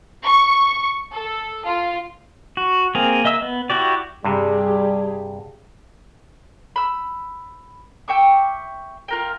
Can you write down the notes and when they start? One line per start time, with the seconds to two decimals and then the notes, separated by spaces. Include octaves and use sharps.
0.23 C#6
1.11 A4
1.65 F4
2.57 F#4
2.95 A#3 C4 G#4 A#4
3.25 A#3 D#5 E5 E6
3.42 B3
3.70 E4 F#4 G4 D5
4.24 G2 C3 G3 G4 G#4
6.76 B5 E6
8.08 E5 G5 C#6 D6
9.08 F4 A#4 G5